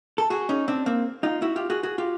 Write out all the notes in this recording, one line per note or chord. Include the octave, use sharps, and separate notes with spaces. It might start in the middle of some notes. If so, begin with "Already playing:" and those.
A4
F#4 G#4
C#4 D#4
C4 D4
A#3 C4
D#4 F4
E4 F#4
F4 G4
F#4 G#4
F#4 G#4
F4 G4